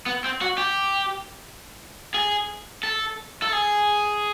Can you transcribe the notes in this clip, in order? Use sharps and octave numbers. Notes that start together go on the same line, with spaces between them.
B3
C4
F#4
G4
G#4
A4
A4
G#4